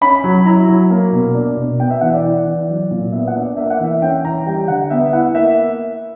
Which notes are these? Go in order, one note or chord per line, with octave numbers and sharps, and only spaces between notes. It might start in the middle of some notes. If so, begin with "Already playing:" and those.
C#4 B5
F#3
E4 A#5
F#3
A#3
B2
D4
B2
B3 G5
E5
E3 F#5
D5
E4
E3
F#3
A#2
B3 E5
F#5
D4
D5
A#3 E5
F#5
E3 E5
C#4 G5
E3 A#5
G3 G5
D3 F#5
B3 E5
E4 F#5
A#3 E5